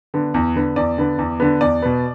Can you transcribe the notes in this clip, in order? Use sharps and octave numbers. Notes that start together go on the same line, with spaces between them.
D3 B3
E2
D3 B3
E2 D5
D3 B3
E2
D3 B3
E2 D5
B2 B3